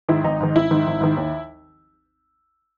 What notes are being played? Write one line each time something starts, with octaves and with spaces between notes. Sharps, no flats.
G#2 D#3 E4
G#1 D#4
G#2 D#3
G#1 E4
G#2 D#3
G#1
G#2 D#3
D#2